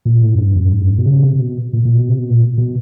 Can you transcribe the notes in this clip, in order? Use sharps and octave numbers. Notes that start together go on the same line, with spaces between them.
A#2
A2
F#2
G2
F#2
G#2
F#2
G#2
B2
C#3
C3
B2
A#2
A#2
B2
C3
B2
A#2
B2